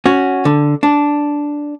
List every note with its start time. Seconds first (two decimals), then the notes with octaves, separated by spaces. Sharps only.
0.06 C#4 F#4
0.45 D3
0.83 D4